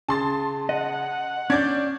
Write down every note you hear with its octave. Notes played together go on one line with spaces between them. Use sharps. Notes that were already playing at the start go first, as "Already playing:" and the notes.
C#3 A5 C6 A6
D#5 F#5
C#4 D4 D5 G6 G#6